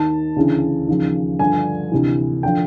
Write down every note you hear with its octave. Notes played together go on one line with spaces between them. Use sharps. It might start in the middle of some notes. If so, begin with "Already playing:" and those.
Already playing: D#2 D#3 A5
D2 C#3 E3
D#2 C#3 F3
G2 D3 F3 G#5
D2 C3 E3
D3 F3 G5